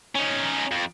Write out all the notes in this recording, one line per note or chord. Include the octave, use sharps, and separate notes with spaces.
C#4 D#4
F2